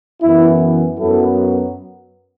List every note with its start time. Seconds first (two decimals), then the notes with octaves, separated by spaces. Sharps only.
0.23 F#2 E3 B3 E4
0.99 F#2 F#3 B3 E4 A4